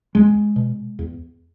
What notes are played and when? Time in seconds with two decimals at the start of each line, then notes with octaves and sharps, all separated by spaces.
0.15 E2 G#3
0.56 B2
0.99 E2